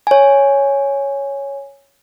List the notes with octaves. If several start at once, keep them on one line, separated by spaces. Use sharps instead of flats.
C#5 G#5